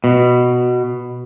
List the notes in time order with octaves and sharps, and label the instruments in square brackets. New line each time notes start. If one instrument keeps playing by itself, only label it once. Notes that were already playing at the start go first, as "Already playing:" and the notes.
[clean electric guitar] B2